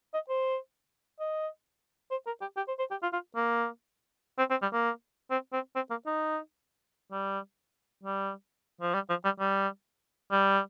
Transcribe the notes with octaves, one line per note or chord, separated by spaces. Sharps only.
D#5
C5
D#5
C5
A#4
G4
G4
C5
C5
G4
F4
F4
A#3
C4
C4
G3
A#3
C4
C4
C4
A#3
D#4
G3
G3
F3
G3
F3
G3
G3
G3